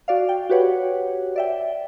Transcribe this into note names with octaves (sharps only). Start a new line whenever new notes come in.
F#4 D5 F5
G5
F#4 G4 B4 C#5 F#5
D5 E5 G5